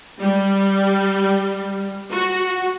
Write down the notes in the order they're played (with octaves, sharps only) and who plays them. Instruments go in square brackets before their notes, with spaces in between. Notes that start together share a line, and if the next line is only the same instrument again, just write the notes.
[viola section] G3
F#4